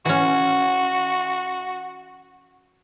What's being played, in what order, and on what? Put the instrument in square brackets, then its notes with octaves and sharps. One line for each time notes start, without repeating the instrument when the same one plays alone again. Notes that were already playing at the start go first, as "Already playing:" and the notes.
[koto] E3 C#4 [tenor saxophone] F#4